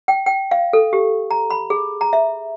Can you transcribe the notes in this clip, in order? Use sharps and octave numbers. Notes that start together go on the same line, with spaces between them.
G5
G5
F5
A4
G4
A#5
B5
G#4
A#5
E5